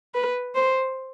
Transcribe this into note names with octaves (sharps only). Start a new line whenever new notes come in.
B4
C5